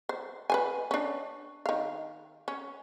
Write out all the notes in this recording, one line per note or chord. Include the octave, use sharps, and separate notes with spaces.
C5
B4 C5 G#5
C#4 D4
D#3 F5
C#4